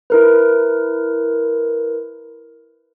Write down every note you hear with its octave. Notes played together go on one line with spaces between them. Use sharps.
E4 A#4 B4